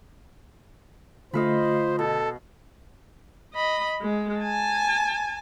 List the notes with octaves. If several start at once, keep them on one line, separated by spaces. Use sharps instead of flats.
D3 A3 F4 C5 D#5 F5 B5
B2 A4
D#5 B5
G#3
G#5 A5